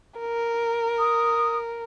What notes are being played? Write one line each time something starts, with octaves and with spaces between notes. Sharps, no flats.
A#4
D#6